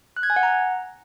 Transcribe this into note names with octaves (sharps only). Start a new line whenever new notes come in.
F#6
G#6
G#5
F#5
A#5